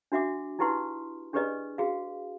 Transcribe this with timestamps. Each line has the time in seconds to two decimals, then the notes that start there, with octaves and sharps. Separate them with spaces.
0.12 D4 F#4 E5 F#5 D6
0.59 D#4 E4 G4 B4 F#5 C6
1.33 D4 G4 G#4 B4 D5 D#5
1.78 F#4 G#4 F5